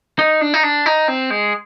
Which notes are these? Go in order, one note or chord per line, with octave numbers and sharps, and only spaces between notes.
D#4
D4
D#4
D4
D#4
C4
G#3